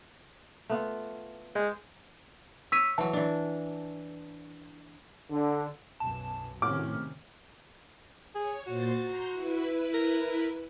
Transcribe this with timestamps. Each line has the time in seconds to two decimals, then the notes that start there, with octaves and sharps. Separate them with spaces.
0.70 A3 B3 F4
1.55 G#3 G5
2.72 C#5 E6 B6 D#7
2.98 E3 F#3 A5
3.13 E3 D4
5.30 D3
6.00 B1 F#2 A5
6.62 A2 C3 D#3 C#4 D6 F6
8.35 G#4 C#5
8.67 A#2 F#4 C5 A6
9.02 A#5 C6 G6
9.32 E4 B4
9.94 A#4